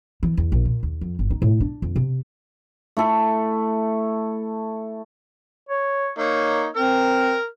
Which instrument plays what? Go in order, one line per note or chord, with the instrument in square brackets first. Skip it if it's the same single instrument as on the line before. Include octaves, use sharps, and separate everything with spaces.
[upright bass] E3
E2
A#1
A#2
D#2
F2
G1
D#4
A2
D4
F2
C3
[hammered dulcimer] A3 E4 A4
[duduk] C#5
[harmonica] A#3 D#4 [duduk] C#5
[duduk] C4 [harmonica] A#4 F6